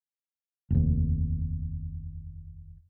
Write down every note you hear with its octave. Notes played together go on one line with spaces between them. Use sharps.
F1 D#2